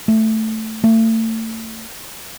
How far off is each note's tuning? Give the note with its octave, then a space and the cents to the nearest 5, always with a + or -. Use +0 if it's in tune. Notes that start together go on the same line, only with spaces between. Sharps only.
A3 +5
A3 +35